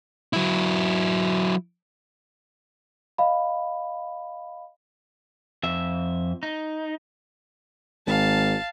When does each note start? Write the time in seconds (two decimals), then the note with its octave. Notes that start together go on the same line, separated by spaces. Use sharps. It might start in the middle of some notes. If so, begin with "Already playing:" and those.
0.33 F#3 E4
3.18 D#5 F5 B5
5.63 F2 E5
6.43 D#4
8.07 G#1 F5 A5